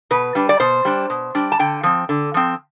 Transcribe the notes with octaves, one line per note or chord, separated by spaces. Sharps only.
B2 B4
G3 D4
D5
B2 C5
G3 D4
B2
G3 D4
A5
D3 G5
F3 C4
D3
F3 C4